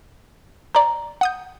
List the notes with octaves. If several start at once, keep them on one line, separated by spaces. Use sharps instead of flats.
C5 D5 A#5
F#5 D#6 G6